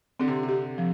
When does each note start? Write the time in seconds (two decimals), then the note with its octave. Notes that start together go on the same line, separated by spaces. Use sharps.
0.20 D3 C4
0.28 C3
0.43 C3
0.48 G4
0.78 F3